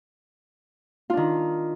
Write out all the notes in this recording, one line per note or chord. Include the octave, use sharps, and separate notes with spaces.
D#3 D4 F4